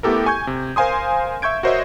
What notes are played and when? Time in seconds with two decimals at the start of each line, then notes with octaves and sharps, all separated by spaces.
0.03 A3 B3 E4 G4 A4 A#4
0.26 G#5 C#6 G6 G#6
0.47 C3
0.76 A#4 C5 F5 G#5 C6 D#6
1.42 E5 C#6 G6 G#6 D7
1.63 F#4 A#4 C5 C#5 D#5 E5